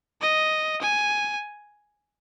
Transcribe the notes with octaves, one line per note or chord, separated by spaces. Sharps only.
D#5
G#5